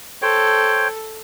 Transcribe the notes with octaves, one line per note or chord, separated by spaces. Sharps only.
A4 C5 C#5 G5